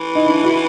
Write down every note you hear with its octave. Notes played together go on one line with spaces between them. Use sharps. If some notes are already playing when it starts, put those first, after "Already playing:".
Already playing: E3
D#4
D4 E4
E4 F#4